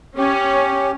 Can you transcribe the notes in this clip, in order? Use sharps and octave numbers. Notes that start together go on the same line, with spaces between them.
C#4 G4